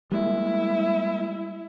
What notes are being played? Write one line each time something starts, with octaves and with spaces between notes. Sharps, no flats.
G3 G#3 A#3 E4